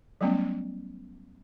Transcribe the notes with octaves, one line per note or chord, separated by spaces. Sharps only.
F#3 G3 A3 B3 C#4